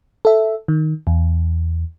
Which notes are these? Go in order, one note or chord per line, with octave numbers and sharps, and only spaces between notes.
A4 E5
D#3
E2